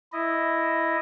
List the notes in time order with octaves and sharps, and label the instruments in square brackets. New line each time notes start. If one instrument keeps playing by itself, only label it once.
[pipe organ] E4 D#5